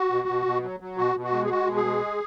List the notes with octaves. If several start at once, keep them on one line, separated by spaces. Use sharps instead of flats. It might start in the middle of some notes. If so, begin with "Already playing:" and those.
Already playing: F#4
B2
B2
B2
F#3
F#3
B2 F#4
B2
F#4
G#3
G#4
G#3 F#4
B2
G#4
G#3